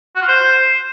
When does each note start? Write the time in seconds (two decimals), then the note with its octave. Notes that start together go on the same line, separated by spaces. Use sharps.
0.16 F#4
0.22 F4
0.28 C5